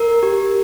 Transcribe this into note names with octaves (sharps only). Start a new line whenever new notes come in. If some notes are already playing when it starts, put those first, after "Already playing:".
Already playing: A#4
G4